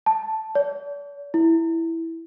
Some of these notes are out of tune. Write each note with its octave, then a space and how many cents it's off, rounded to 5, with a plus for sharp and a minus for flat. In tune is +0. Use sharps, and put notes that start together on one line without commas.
A5 -5
D5 -45
E4 +0